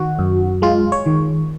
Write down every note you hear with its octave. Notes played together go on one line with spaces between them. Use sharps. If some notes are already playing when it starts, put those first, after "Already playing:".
Already playing: D#3 F#4
F#2
G#3 F4
C#5
D#3